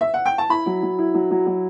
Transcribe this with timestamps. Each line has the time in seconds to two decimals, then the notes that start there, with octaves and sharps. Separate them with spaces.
0.01 E5
0.14 F#5
0.26 G5
0.38 A5
0.49 E4 B5
0.66 F#3
0.83 F#3
0.99 E4
1.14 F#3
1.31 F#3
1.47 F#3